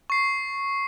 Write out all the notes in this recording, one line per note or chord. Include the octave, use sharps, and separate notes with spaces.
C#6 C7